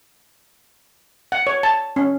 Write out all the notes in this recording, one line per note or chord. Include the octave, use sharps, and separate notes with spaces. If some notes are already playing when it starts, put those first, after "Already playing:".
F#5
C#5
A5
C#4